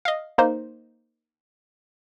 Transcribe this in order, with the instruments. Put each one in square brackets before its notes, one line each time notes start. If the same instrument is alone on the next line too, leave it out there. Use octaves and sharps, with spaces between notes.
[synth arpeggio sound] D#5 F5
A#3 D#4 C5